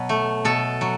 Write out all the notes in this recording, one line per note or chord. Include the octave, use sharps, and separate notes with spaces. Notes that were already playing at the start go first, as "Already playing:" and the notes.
Already playing: B2 F#3
A3
B2 A4
F#3